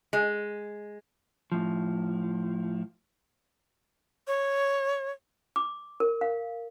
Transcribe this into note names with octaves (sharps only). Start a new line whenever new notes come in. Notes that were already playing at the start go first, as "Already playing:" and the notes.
G#3
A2 F3
C#5
D6
A#4
F5